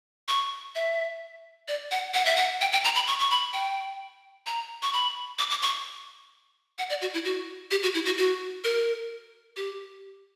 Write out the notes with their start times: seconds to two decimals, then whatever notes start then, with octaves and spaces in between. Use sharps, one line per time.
0.28 C#6
0.75 E5
1.68 D5
1.91 F#5
2.14 F#5
2.25 E5
2.36 F#5
2.61 G5
2.72 G5
2.84 A#5
2.95 B5
3.07 C#6
3.19 C#6
3.30 B5
3.53 G5
4.46 A#5
4.82 C#6
4.93 B5
5.39 D6
5.50 D6
5.62 C#6
6.78 F#5
6.90 D5
7.02 F#4
7.14 E4
7.25 F#4
7.71 G4
7.83 F#4
7.95 E4
8.06 F#4
8.18 F#4
8.64 A#4
9.57 G4